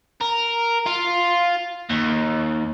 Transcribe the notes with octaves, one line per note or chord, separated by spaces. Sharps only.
A#4
F4
D#2